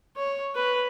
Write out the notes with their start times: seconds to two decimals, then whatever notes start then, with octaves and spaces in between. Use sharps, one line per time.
0.17 C#5
0.55 B4